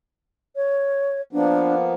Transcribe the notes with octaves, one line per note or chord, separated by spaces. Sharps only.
C#5
F3 A#3 B3 D4